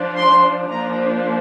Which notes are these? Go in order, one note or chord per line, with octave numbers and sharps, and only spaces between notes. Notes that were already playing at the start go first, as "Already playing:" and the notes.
Already playing: F3 D4
C6
F3 A#3 D4 A#5